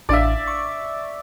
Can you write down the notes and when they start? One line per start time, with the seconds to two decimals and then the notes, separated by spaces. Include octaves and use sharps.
0.09 A1 D4 D5 E5 F5
0.47 C#6